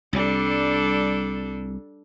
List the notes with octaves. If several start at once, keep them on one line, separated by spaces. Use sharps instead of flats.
C2 G3 D4 A4